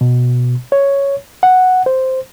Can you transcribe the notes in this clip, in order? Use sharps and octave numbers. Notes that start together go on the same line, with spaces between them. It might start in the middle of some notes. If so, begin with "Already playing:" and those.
B2
C#5
F#5
C5